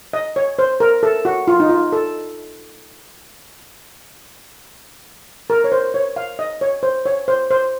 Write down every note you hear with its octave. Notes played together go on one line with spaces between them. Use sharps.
D#5
C#5
C5
A#4
A4
F#4
F4
D#4
F4
A4
A#4
C#5
C5
C#5
F5
D#5
C#5
C5
C#5
C5
C5